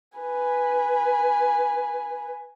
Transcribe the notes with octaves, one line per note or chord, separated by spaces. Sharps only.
B4 G#5